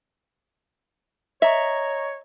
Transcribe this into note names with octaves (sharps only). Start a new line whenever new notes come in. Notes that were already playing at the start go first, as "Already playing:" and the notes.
C#5 D#5 E5 A#5 C#6